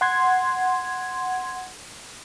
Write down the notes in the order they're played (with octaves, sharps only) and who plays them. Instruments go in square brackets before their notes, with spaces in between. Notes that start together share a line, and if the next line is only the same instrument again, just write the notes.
[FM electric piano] F#5 C6 G#6